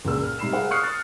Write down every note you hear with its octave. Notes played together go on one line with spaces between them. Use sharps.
C#2 A#2 A#3 G#4 E6
F6
C3 G3 D#4 B5 C7 E7
G#4 A#4 C5 F5 F#5
C#6 D#6 F6 F#6 C7 C#7
A6 C7